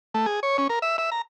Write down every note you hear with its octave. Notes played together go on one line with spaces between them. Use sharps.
A3
G#4
C#5
C#4
A#4
E5
E5
A#5